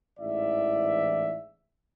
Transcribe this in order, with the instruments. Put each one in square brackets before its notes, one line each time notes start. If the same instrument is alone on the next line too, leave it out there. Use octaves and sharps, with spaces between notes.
[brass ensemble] A1 G#2 E3 D5 E5